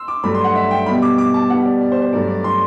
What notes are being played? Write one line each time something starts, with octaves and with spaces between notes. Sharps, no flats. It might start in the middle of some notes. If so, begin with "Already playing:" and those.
Already playing: C6 E6
D6
G2 F#3 A3 B5
C6
F#5
E5
G5
B2 G3 B5
D6
D6
A5
B2 G3 F#5
D5
D5
C5
C5
G2 F#3 A3 D5
D5
C6